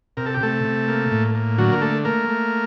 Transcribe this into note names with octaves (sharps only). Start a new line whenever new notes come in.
C3 A#4
A4
G4
C3 A3 A4
C3
A#3
A2
A#3
D3 F#3 F#4
A#4
A3 A4
A3 A#3 A#4
A3